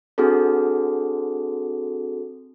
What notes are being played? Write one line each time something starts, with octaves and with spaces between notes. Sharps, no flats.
C4 D4 F#4 G#4 A4